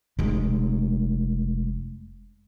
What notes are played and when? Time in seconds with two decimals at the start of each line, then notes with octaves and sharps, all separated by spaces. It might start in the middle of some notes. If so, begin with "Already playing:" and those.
0.19 F1 G#3